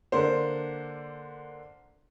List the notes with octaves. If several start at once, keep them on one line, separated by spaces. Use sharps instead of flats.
D3 A#3 D4 C5